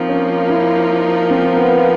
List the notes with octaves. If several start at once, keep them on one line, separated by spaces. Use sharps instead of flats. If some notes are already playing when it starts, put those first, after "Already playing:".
Already playing: F3 A#3 C4 D#4
C#4
E4
C4
B3